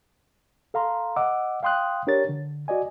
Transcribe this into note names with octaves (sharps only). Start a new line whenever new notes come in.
A4 F5 A#5 C6
D#5 F#5 D6 E6
F5 G5 C6 D#6 F#6
D4 G4 A#4 C#5 A6
D3
F#4 D5 D#5 G#5